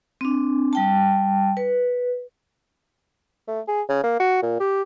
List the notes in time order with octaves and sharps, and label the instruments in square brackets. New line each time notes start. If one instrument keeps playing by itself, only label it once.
[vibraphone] C4 D4
G3 G5 A5
B4
[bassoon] A3
G#4
C#3
A#3
F#4
A#2
G4